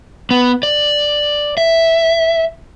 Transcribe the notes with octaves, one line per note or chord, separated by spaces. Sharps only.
B3
D5
E5